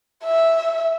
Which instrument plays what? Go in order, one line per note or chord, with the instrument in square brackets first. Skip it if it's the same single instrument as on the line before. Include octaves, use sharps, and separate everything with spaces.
[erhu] E5